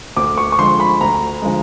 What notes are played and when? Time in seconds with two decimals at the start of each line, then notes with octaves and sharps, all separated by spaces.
0.16 D2 D6
0.38 C#6
0.52 C#6
0.58 D3 F3 G#3 C6
0.80 B5
1.01 D2 A#5
1.42 D3 F3 G#3